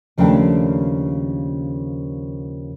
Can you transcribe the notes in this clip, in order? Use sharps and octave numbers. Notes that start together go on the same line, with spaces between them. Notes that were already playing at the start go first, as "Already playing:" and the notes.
D#2 C#3 F3 A3 D4 G5